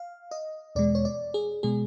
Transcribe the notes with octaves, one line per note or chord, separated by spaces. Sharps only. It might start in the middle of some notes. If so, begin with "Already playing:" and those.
Already playing: F5
D#5
E2 B2 G#3 D5
C#5
D5
G#4
B2 G#3 G#4